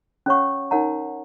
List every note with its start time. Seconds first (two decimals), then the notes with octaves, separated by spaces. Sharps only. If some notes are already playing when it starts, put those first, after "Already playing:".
0.26 C#4 G#4 C#5 F#5 C#6
0.71 D#4 A#4 C#5 F#5 A#5